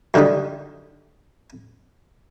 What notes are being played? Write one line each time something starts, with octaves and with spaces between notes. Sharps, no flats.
F#2 D3 D#3 G3 D#4